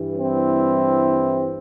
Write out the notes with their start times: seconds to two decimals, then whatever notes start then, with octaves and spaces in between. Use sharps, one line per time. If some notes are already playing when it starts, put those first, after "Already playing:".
Already playing: G2 E3 G3
0.17 C4 E4